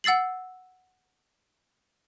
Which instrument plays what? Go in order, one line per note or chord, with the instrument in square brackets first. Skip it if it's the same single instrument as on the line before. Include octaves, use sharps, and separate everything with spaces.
[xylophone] F#5 E6 A6 C7 F#7